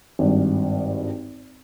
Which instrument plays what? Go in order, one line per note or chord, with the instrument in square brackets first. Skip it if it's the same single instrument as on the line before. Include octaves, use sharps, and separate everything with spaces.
[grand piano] G#1 G2